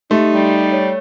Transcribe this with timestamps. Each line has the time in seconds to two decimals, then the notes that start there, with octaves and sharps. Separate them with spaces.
0.11 A3 D#4 G4 C6
0.32 G3
0.72 C#5